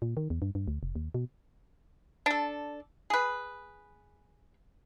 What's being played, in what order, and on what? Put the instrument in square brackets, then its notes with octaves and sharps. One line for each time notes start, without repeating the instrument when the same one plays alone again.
[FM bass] A#2
D#3
E2
G2
G2
D2
F1
D#2
B2
[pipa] D4 A4
G#4 B4